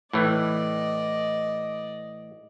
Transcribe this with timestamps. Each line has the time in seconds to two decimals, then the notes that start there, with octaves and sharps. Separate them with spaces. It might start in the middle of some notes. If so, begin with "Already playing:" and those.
0.13 A2 E3 D5 D#5